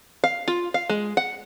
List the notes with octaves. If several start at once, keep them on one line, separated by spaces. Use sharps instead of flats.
F5
F4
F5
G#3
F#5